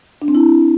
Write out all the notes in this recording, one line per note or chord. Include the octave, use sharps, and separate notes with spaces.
D4
C4
E4